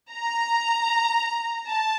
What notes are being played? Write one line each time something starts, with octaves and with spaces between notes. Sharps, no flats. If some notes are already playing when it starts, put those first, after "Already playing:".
A#5
A5